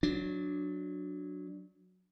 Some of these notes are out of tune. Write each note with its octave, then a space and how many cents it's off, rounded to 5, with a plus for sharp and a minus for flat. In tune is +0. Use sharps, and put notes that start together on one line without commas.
F#3 -15 D4 +0